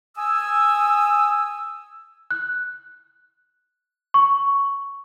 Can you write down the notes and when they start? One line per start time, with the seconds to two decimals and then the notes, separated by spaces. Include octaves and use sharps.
0.16 G#5 D#6 E6
2.31 F#6
4.14 C#6